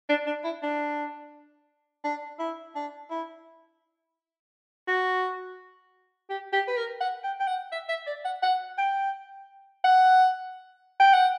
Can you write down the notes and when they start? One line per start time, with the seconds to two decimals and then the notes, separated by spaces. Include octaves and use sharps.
0.09 D4
0.27 D4
0.44 E4
0.63 D4
2.04 D4
2.39 E4
2.75 D4
3.10 E4
4.88 F#4
6.30 G4
6.53 G4
6.68 B4
6.77 A#4
7.01 F#5
7.24 G5
7.40 G5
7.48 F#5
7.72 E5
7.89 E5
8.07 D5
8.25 F#5
8.43 F#5
8.78 G5
9.84 F#5
11.00 G5
11.14 F#5